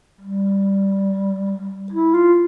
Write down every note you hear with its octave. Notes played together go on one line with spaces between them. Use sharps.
G3
E4
F4